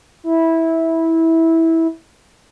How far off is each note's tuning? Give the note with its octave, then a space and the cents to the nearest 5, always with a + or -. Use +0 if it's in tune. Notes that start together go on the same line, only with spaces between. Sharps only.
E4 -15